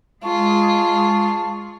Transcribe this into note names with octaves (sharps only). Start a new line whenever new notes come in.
G#3 F4 G#4 A5 C#6